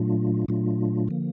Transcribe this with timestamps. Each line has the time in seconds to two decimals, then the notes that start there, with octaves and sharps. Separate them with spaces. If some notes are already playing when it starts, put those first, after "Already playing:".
Already playing: A#2 F#3 A3 D4 F4
0.48 A#2 F#3 A3 D4 F4
1.08 D3 F3 A#3